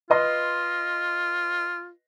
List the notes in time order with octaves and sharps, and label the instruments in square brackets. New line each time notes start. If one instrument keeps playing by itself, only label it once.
[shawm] F4 [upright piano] B4 D#5 C6